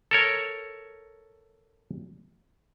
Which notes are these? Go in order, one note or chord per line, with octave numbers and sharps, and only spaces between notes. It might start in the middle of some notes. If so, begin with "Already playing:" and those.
A4 A#4 C#5